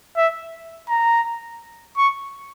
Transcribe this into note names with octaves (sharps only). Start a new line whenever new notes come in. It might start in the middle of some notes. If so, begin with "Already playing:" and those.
E5
A#5
C#6